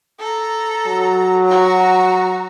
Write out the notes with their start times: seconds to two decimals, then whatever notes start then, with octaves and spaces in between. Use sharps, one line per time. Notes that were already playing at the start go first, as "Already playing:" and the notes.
0.20 A4 A#5
0.87 F#3
1.46 F#4 A#5